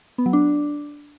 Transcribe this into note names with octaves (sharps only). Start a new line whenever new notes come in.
B3
F#3
D4